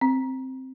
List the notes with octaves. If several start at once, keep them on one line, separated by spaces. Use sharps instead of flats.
C4